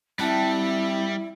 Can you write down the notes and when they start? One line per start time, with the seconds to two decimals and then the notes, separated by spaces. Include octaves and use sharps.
0.19 G3 C4 E4 F#5 G5 A5